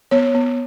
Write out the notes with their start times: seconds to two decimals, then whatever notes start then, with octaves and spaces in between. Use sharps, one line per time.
0.11 B3 C#5
0.34 B3